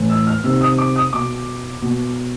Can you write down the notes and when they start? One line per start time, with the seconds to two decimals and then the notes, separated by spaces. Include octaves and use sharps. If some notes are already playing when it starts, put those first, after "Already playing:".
Already playing: A2 E3
0.10 E6
0.27 F6
0.44 C3 D#3 E6
0.61 D#6
0.78 D6
0.96 D#6
1.13 B2 D6
1.82 B2